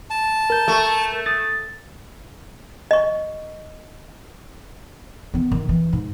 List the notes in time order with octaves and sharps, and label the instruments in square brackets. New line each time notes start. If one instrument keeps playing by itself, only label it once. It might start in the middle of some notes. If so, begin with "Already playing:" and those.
[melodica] A5
[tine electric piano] A#4 G6
[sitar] A3
[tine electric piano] D#6 A6
[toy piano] D#5 C#6
[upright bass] D#3 B3
D#3
E3
G#2